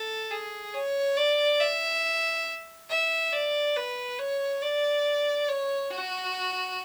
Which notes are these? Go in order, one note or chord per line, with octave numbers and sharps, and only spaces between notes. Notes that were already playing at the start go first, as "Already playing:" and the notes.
Already playing: A4
G#4
C#5
D5
E5
E5
D5
B4
C#5
D5
C#5
F#4